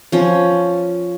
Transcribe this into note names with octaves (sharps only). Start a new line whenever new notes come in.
F3 C#4